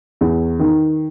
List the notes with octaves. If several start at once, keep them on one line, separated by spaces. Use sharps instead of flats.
E2
D#3